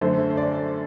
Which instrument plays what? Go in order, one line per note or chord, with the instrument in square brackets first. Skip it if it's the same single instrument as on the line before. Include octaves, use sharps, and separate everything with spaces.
[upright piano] F#2 D3 A3 C5
C5
D5